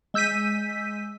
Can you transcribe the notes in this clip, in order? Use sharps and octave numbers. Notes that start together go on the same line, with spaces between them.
G#3 E6 G6 B6 D#7